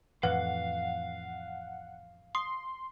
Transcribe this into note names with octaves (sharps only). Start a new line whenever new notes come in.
F2 A2 E3 B4 F5 F#5
C6 D#6